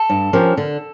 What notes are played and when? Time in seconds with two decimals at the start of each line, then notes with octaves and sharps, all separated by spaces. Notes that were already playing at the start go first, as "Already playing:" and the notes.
Already playing: A4
0.10 G2
0.33 F3 C#4 G4 A#4
0.57 D3